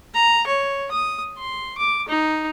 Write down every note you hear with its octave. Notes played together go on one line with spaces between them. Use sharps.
A#5
C#5
D#6
C6
D6
D#4